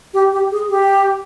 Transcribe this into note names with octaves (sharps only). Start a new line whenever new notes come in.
G4
G4
G#4
G4